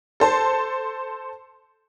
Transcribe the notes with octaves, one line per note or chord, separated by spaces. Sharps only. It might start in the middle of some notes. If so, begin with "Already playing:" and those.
A4 C5 A5